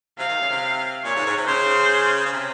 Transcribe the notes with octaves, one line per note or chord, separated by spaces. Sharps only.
C3 F5
D#3
C#3
C3
A#2 C#5
G#2
G#2
C3
C#3 C5
C#3
C3